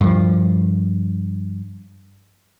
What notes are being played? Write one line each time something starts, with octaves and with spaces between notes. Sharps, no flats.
G2 F3